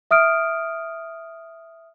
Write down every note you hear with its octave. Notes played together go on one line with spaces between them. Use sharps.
E5 D#6 F6 D7